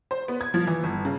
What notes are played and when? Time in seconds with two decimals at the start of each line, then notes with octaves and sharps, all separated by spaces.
0.11 C5
0.28 B3
0.41 G#6
0.54 F3
0.67 E3
0.83 G1
1.05 C#3